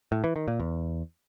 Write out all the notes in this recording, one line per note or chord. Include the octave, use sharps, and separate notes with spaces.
A2
E3
D#3
A#2
E2